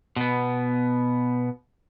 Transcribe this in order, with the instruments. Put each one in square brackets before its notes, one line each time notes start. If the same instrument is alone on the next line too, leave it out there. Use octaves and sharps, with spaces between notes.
[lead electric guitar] B2 B3